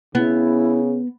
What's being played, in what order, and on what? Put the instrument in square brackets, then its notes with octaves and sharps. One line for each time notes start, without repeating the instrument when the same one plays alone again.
[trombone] C#3 [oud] B3 [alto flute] E4